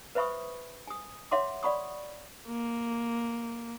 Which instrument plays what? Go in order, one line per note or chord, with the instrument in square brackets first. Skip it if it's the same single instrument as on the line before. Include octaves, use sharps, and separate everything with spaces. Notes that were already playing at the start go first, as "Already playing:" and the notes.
[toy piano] B4 C5 E5 B5 C#6 D#6
G#5 D#6
C#5 E5 F#5 C6 D6
D5 F#5 B5 C#6 D#6
[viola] A#3